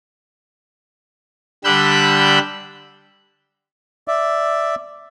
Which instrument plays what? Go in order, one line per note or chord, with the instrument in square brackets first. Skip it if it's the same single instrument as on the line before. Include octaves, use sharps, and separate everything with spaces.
[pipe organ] D3 G3 B5 E6 F#6 G6
[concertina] D5 E5